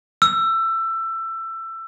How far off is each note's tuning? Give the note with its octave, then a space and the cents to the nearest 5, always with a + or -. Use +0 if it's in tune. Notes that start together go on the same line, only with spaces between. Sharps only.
E6 +20